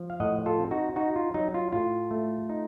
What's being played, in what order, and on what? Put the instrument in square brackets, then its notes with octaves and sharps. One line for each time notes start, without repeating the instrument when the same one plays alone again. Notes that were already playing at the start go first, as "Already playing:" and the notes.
Already playing: [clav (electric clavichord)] F3
F5
A2 D#5 F#5
F4 A4
C4
D#4 F#4
D#4 F#4
F4
F#3 D#4
F4
A2 F4
A3
D#4